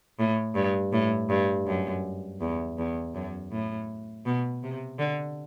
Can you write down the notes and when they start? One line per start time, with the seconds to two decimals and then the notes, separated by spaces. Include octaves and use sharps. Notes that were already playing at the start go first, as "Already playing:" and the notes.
0.19 A2
0.55 G2
0.93 A2
1.30 G2
1.67 F#2
2.41 E2
2.78 E2
3.15 F#2
3.52 A2
4.26 B2
4.63 C3
4.99 D3